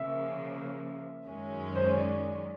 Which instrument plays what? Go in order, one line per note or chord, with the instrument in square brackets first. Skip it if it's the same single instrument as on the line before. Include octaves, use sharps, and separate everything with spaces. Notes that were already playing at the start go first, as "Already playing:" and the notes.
Already playing: [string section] C#3 F3 A#3 [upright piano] E5
[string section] F#2 D#3 G#3 C#4
[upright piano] C5
C#5
D5